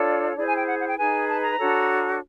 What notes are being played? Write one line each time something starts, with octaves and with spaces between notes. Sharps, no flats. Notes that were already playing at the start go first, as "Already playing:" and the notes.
Already playing: D4 F4 A4 C#5 D5
E4 G#4 C5 D5
G#5
G5
F#5
F#5
G5
D#4 G#4 B4 G#5
A5
A#5
D4 F#4 A4 C#5